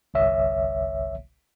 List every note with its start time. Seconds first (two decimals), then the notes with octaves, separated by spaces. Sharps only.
0.14 G1 C2 C#5 E5